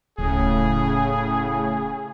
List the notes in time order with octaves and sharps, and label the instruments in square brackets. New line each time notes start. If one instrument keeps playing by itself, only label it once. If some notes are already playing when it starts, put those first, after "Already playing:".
[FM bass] D1 [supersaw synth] A2 C#3 [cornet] G#4